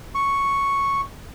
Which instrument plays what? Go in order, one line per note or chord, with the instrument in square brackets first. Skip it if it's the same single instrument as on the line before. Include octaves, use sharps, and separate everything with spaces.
[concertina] C#6